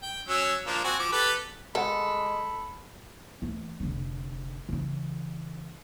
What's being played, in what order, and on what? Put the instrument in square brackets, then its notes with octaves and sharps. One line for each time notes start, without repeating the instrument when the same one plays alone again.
[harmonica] G5
F#3 C#4 E6
F3 A#3 D4
C4 F#4 G#5
F3 D6
G4 A4 B4
[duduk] G#3 [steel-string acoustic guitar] A4 [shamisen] A#4 F#5 [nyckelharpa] B5
[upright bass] E3 A3
F1 D3
C#3 E3